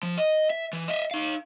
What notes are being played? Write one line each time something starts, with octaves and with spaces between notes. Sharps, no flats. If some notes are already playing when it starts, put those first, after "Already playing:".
F3
D#5
E5
E3
D#5 E5
D#4 F5